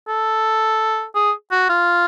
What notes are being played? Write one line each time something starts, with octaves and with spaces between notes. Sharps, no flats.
A4
G#4
F#4
F4